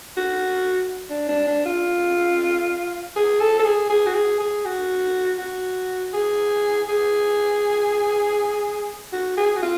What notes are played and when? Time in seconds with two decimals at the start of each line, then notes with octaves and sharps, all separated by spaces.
0.17 F#4
1.10 D4
1.28 D4
1.47 D4
1.66 F4
3.16 G#4
3.40 A4
3.59 A4
3.65 G#4
3.90 G#4
4.06 F#4
4.15 G#4
4.40 G#4
4.65 F#4
5.39 F#4
6.14 G#4
6.89 G#4
9.13 F#4
9.37 G#4
9.57 F#4
9.63 F4